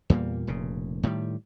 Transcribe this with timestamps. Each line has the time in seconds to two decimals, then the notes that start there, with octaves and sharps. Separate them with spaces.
0.10 E2 A#2 G3 A#3
0.47 F1 A#2 C#3
1.03 A2 D#3 F#3 G3